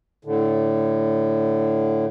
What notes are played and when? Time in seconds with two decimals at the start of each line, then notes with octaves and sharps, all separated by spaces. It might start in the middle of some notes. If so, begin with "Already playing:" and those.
0.25 A2 D3